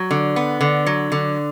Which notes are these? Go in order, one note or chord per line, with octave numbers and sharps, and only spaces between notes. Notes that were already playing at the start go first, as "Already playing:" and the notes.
Already playing: F#3
D3
B3
D3
F#3
D3